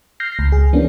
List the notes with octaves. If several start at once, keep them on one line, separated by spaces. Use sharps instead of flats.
F6 G6 A#6 C7
C#2
G#4
E3 A#3 B3 C#4 D4